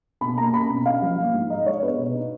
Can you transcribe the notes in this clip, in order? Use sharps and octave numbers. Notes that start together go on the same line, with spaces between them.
B2 B5
A#3 A#5
C#4 B5
B2
C#4 F5
F3
A#3
G#2
D#4 D#5
G#3 C#5
B3 B4
B2
D#4